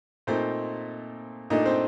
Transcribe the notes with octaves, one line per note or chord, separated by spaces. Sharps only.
A#2 A3 C4 D#4 C5
A#2 A3 D4 D#4 D#5
C4 C5